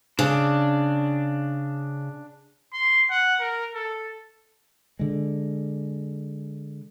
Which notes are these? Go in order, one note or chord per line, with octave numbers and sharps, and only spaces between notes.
C#3 D4
C6
F#5
A#4
A4
D3 G#3